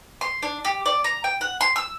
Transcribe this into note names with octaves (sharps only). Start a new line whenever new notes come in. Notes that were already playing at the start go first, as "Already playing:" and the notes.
C6
D4
G4
D5
A#5
G5
F#5
C6
E6